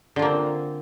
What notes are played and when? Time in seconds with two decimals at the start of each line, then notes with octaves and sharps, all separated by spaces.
0.16 D3
0.19 F4
0.22 A#3
0.25 C4